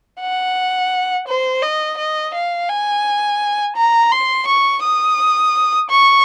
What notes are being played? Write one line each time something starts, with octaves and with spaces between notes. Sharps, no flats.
F#5
C5
D#5
D#5
F5
G#5
A#5
C6
C#6
D#6
C#6